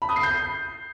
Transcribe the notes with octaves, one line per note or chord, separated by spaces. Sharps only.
B5
D#6
C7
G6
C7